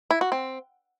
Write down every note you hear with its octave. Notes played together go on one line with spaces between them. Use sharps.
E4
F#4
C4